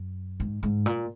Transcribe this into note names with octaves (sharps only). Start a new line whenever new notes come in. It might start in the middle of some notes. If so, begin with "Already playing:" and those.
Already playing: F#2
G#2
G#2
A#2